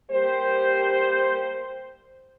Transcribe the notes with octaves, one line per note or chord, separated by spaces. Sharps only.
G3 A#3 G4 C5